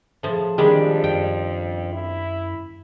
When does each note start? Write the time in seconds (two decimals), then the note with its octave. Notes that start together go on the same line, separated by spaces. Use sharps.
0.23 A2 F3 G#4 A5
0.58 F2 D#3 G3 G#3 D4 G4
1.04 F#2 G5
1.93 E4